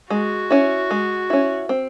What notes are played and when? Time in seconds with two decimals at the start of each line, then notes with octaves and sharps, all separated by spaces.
0.10 G#3 F#4
0.51 C#4 E4
0.91 G#3
1.30 C#4 E4
1.69 C4